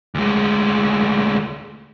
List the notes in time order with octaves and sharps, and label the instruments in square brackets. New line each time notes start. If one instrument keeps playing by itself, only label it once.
[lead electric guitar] D2 G#3